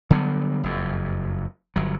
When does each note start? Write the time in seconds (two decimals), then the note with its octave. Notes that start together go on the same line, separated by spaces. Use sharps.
0.10 D3 F#3 G3 B3
0.63 F#1 F2
1.76 G1 F#3